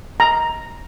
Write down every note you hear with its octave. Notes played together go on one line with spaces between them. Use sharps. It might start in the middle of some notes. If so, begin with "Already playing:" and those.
A#5